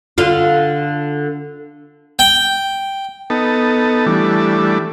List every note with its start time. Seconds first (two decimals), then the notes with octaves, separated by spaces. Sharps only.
0.18 D3 F4
2.19 G5
3.30 B3 D#4 A4
4.06 E3 G3 A3 D4